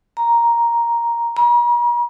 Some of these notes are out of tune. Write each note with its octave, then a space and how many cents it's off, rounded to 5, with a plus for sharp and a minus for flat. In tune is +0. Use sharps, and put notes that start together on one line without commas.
A#5 +5
A#5 +45